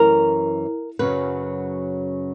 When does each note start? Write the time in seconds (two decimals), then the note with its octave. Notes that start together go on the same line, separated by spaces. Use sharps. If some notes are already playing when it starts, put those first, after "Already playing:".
Already playing: F#2 E3 A#4
0.99 F#2 C#3 F#3 B4